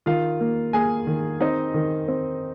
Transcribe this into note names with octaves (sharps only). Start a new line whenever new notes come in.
D#3 F4 F5
A#3
A#3 G#4 G#5
D#3
C4 D#4 D#5
D#3
C4